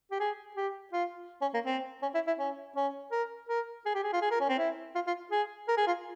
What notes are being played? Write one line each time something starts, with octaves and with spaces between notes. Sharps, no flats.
G4
G#4
G4
F4
C#4
A#3
C4
C#4
E4
E4
C#4
C#4
A#4
A#4
G#4
G4
G#4
F4
G#4
A#4
C#4
C4
E4
F4
F4
G#4
A#4
G#4
F4